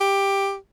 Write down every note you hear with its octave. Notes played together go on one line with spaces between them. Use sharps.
G4